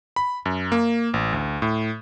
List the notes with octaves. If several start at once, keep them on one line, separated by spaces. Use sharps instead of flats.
B5
F#2
A#3
A1
D2
A2